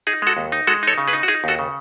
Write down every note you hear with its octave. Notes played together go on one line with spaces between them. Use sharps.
D#4 G#4
G#3 F#4 A4
D#2
D#4
G#3 F#4 A4
D#4 A4 C#5
C#3
G#4 B4
D#4
F#4
D#4 G#4
D#2 F#4 A4
C#3